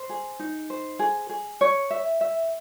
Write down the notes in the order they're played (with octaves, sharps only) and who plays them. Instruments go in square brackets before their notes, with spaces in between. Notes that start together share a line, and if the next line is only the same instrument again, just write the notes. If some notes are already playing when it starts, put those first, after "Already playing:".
Already playing: [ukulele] C5
G#4
D#4
C5
G#4
G#4
C#5
E5
E5